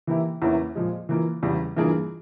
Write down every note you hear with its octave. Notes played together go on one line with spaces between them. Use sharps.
E3 A#3 E4 G4
E2 E3 A#3 C#4 E4
A#2 F3 G#3
E3 A#3 F4
E2 C#3 G3
G2 E3 A#3 F4 G#4